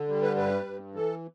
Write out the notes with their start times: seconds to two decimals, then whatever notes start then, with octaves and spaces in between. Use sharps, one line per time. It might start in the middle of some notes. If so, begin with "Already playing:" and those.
Already playing: D3
0.08 G3
0.22 B4
0.36 G2 B4
0.65 G2
0.94 E3 A4